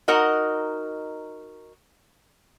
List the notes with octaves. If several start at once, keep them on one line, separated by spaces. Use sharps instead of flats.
D#4 F#4 A#4 D#5 F#5